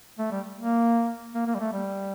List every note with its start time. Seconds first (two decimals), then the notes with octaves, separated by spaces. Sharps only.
0.18 A3
0.31 G3
0.57 A#3
1.34 A#3
1.47 A#3
1.55 G3
1.59 A3
1.72 G3